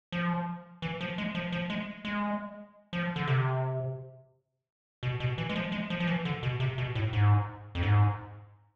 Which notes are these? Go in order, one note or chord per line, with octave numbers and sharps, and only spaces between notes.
F3
E3
F3
G#3
F3
F3
G#3
G#3
F3
D3
C3
B2
B2
E3
G#3
F3
G#3
F3
F3
E3
D3
B2
C3
B2
A2
G#2
F2
G#2